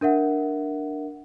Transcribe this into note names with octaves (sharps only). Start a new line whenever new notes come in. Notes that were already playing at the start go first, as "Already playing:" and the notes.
D4 A#4 E5 F#5